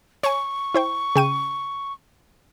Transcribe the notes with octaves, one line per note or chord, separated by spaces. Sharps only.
C#5 G#5 C#6
E4 C5 G5
C#3 G5 D#7